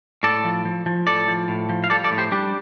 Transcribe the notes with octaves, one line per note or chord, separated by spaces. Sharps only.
A2 A4 D5
F3
F3
F3
A2 A4 D5
F3
A2
F3
F5
G3 A4 D5
A4 D5
A2
G4 C5
G3 D4 G4